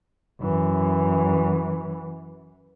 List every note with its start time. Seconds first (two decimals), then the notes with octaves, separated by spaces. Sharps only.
0.41 F#2 E3